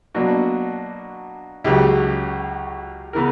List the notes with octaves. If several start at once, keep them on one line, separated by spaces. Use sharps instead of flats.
B2 F#3 A#3 D4 F#4
C#2 C#3 F#3 G4
C#3 E3 B3 A#4